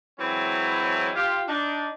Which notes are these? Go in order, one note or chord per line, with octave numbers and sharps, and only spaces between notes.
E3 F#3 G#3 C4 C#4 E4
F4 G4
D4 D#4